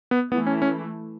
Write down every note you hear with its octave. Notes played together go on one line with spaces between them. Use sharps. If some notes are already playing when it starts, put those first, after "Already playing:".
B3
E3 A3 B3 E4
C#4
C#4